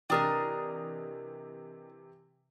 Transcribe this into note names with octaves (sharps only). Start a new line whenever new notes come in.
C3 E3 D4 A#4 D#5 G5 D#6 A6